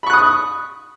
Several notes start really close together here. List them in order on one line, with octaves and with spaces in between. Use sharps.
B5 C#6 F#6 D#6